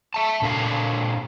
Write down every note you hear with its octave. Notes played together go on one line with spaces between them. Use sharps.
E5 A5
A#2 D4 A4 F5